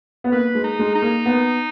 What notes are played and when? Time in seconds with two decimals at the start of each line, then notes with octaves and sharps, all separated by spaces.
0.24 B3
0.32 A#3 B4
0.55 G#3
0.64 D#4
0.79 G#3
0.95 D#4
1.02 A#3
1.26 B3